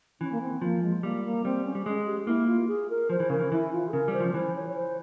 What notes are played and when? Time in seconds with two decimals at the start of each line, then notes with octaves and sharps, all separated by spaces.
0.21 E3 C#4
0.32 A#3
0.41 C4
0.62 F3 A#3
0.83 G#3
1.03 G3 A#3
1.24 A#3
1.44 G3 C4
1.65 C#4
1.75 G3
1.86 G#3
2.06 G4
2.27 A#3 E4
2.47 F4
2.68 G#4
2.90 A#4
3.10 F3 C5
3.20 E3
3.30 C#3 A#4
3.39 E3
3.52 E3 E4
3.73 F4
3.89 G#4
3.92 C#3 A#4
4.08 G3
4.13 C5
4.20 F3
4.34 E3 C5
4.56 C#5
4.69 C#5
4.76 C5